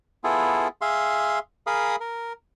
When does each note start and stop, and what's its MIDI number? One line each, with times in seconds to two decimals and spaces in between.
0.24 0.68 59
0.24 0.68 64
0.24 0.68 65
0.24 0.68 68
0.24 0.68 69
0.81 1.39 68
0.81 1.39 76
0.81 1.39 77
0.81 1.39 84
1.67 1.96 68
1.67 1.96 70
1.67 1.96 77
1.67 1.96 83
1.67 1.96 87
2.00 2.33 70